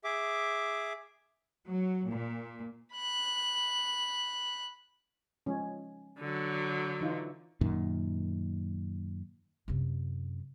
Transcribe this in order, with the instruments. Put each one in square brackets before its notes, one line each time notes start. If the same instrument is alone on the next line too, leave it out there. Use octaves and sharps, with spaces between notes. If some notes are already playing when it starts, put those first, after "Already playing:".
[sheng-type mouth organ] G#4 E5 D6
[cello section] F#3
A#2
[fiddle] B5 F#6
[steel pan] F3 G#3 C#4
[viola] D3 F#3
[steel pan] E3 D#4 F4
[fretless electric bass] F#2 A#2 D#3
[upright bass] F#2 C3